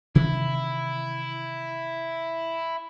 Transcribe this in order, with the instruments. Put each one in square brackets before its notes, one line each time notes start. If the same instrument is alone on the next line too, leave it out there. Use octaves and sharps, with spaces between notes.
[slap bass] C3 D#3 E3 [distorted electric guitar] E4